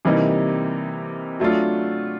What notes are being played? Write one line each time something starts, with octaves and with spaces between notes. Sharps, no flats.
C3 E3 G3 A#3 D#4
F#3 A3 D4 F4